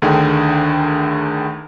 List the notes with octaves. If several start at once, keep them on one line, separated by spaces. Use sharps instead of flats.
D2 D3 D#3 G#4 G5